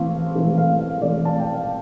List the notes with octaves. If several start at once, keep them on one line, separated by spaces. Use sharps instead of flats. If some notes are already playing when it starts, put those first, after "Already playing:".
Already playing: E3 A3 C4 F5
E3 A3 C4
F5
F5
E3 A3 C4 D5
A5
G5
F5